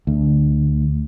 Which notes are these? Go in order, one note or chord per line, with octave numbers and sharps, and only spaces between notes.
D2